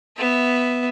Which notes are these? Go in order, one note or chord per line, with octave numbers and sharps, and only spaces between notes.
B3 E5